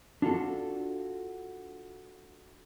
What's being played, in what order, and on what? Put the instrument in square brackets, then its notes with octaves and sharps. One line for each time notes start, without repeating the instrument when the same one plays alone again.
[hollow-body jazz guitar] D4 F4 F#4 A4